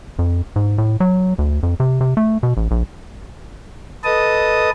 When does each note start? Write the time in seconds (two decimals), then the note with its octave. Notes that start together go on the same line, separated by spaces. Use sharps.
0.19 F2
0.56 G#2
0.78 A2
1.00 F#3
1.39 D2
1.63 F2
1.80 C3
2.01 C3
2.17 A3
2.43 B2
2.57 A1
2.71 A#1
4.04 A4 B4 D#5 A5 D#6